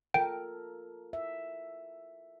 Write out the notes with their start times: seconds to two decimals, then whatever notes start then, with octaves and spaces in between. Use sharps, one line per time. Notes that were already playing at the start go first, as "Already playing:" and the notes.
0.14 F4 A4 A#4 G5
1.13 E5